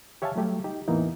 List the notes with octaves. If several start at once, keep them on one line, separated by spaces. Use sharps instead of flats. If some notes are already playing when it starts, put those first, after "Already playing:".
G4 C#5 E5 F5 G#5 A5
F#3 G3 A3 G4
D#4 G4
E2 A2 E3 A#3 B3 D#4